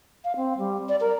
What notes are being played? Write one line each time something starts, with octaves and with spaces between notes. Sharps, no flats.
F5
C4
G3
D5
A#4